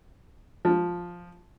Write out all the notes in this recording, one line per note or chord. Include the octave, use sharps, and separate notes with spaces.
F3